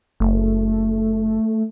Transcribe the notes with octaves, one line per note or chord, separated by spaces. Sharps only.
F#1 A3